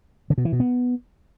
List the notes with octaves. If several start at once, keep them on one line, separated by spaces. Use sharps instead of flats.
D3
B2
E3
B2
B3